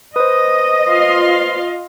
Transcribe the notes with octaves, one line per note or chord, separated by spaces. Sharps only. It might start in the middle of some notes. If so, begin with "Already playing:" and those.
B4 C5 D#5 D#6
F4 F5 C6